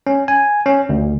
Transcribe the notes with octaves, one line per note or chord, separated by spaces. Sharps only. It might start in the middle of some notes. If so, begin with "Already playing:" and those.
C#4
G#5
C#4
D2